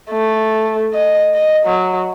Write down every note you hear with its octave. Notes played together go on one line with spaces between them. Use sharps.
A3
D#5
D#5
F#3